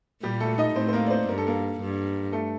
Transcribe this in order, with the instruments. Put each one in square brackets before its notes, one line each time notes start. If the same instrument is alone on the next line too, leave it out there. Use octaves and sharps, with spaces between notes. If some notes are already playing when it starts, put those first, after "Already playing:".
[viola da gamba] A#2 [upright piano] G3 G4
[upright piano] A3 A4
D#4 D#5
[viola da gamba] A2 [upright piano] C4 C5
[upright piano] C5
A#3 A#4
D5
C4 C5
[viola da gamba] G2 [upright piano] A#4
[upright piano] A4
A#3 A#4
[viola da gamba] G2
[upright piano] A3 A4